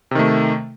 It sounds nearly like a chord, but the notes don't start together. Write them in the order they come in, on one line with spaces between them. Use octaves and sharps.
C3 D#3 A3